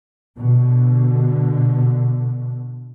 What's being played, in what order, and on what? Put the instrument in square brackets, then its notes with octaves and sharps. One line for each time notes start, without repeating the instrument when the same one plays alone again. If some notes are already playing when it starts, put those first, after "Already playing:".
[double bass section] B2 D3